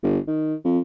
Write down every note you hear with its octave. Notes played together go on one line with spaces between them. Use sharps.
G1
D#3
F2